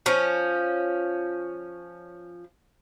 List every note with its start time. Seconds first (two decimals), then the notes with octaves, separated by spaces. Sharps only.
0.06 F3 C#4